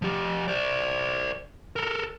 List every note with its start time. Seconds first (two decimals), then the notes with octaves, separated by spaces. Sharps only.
0.02 F3 G4
0.48 C5 D5
1.76 A4 A#4